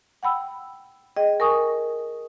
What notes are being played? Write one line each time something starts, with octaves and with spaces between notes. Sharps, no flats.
F#5 G5 B5 E6
G#4 D#5 G5
A#4 G#5 C#6 D#6